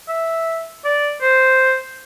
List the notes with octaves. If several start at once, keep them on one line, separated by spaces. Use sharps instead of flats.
E5
D5
C5